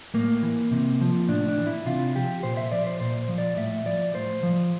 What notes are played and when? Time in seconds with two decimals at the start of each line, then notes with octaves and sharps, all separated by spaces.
0.14 A2 A#3
0.43 E3
0.71 C3
1.01 F3
1.28 A2 D4
1.48 D4
1.58 E3
1.67 E4
1.86 C3 F4
2.15 F3 G4
2.43 A#2 C5
2.57 E5
2.72 F3 D5
2.87 C5
3.00 A#2 C5
3.28 F3
3.38 D5
3.57 A2 E5
3.86 F3 D5
4.15 A2 C5
4.43 F3